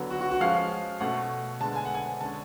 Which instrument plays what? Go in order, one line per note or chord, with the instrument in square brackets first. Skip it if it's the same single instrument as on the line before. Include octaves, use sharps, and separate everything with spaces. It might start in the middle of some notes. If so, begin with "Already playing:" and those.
Already playing: [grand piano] D3 F#3 B3
F#4
F#4
F#4
F3 G#3 C#4 F5
B2 A3 C#4 F#5
D3 G#3 B3 A5
G#5
F#5
G#5
D3 G#3 C#4 A5